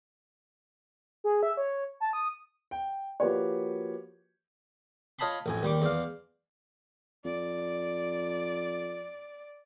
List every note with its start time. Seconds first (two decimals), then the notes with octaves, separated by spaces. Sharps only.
1.24 G#4
1.43 E5
1.57 C#5
2.00 A5
2.13 D#6
2.71 G5
3.20 F3 A#3 F#4 G4 B4 C#5
5.19 F4 C#5 D#5 A5 B5 C6
5.46 A1 F2 G#5
5.63 D#2 G3 C#6 D6
5.82 E2 D5 F5
7.25 F2 D5